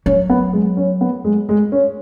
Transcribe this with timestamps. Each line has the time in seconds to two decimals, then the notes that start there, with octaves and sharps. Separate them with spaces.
0.06 F#3 C#4
0.30 B3
0.53 G#3
0.77 C#4
1.01 B3
1.24 G#3
1.49 G#3
1.72 C#4